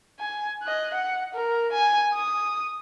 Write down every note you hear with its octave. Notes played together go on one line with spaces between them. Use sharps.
G#5
D#5 F#6
F#5
A#4
G#5
D#6